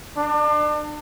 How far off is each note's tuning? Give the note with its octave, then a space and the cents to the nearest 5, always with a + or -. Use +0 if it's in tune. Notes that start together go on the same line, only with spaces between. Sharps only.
D4 +35